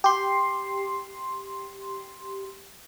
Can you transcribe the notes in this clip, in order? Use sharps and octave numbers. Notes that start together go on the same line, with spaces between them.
G4 C6